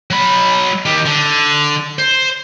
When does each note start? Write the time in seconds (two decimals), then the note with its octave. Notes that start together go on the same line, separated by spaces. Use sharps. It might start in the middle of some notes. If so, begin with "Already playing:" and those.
0.10 F#3 B5
0.85 D#3 G4
1.06 D3
1.99 C5